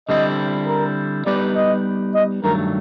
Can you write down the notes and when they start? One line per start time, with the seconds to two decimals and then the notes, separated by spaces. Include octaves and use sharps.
0.08 D3 G3 C4 E4 D#5
0.67 A#4
1.26 G3 B3 D#4 G4 B4 D5
1.55 D#5
2.15 D#5
2.44 G2 D#3 F#3 A3 A#4